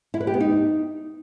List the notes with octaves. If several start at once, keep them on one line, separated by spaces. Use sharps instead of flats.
E4
B4
G4
B3
D#4